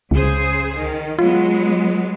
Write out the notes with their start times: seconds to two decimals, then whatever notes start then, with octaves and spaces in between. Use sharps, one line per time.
0.11 C#2 C#3 G#4 C5
0.75 D#3
1.19 F#3 G#3 B3 F4